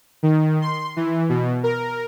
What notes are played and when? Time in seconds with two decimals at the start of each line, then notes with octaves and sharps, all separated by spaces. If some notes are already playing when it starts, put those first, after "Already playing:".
0.23 D#3
0.62 C6
0.97 E3
1.29 B2
1.64 A#4